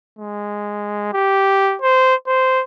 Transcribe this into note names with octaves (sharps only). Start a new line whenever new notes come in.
G#3
G4
C5
C5